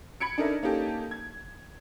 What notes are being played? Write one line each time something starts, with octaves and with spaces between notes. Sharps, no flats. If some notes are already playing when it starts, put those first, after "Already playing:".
B5 G#6 C#7 D7
D4 D#4 A4 A#4 E5
A#3 C#4 D#4 G4 A4
G#6